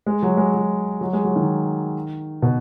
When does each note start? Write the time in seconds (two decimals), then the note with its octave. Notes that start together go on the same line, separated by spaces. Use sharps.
0.06 G#3
0.23 F#3
0.37 G#3
0.54 F#3
1.01 F#3
1.13 G#3
1.25 F#3
1.36 D#3
2.42 B2